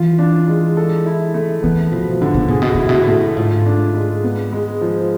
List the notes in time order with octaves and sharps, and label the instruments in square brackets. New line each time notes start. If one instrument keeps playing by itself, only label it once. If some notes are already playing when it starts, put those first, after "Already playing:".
Already playing: [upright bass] E3 [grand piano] F4
[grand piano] D4
G#3
A4
E4
A3
[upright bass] E3 [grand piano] B3
[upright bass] B2 [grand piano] F3
[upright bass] A2 [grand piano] D3
[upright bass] B2
[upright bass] A2 [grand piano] G#4
[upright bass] B2
[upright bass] A2 [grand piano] E4
[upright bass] B2
A2
[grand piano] A3
[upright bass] G#2 [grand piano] F4
[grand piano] D4
G#3
B3
G#3
F3